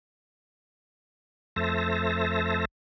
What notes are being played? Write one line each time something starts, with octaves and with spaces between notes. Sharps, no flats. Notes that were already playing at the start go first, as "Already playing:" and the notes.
F2 A3 C5 E5 A5 A#6